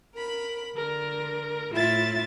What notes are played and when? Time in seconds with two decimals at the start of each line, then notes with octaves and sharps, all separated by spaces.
0.14 A#4 B5
0.75 D3 A#4
1.74 A2 E4 F4 E5 A6